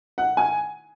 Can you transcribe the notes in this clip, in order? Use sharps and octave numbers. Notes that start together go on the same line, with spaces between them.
F#5
G#5